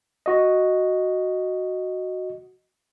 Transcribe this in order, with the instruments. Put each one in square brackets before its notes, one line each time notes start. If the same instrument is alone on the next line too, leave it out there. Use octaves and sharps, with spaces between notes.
[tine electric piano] F#4 D#5